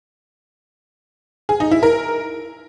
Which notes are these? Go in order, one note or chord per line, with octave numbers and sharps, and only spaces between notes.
G#4
D#4
E4
A#4